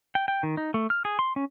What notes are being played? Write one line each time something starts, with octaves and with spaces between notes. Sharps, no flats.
G5
G5
D#3
D#4
A3
F6
G#4
C6
C#4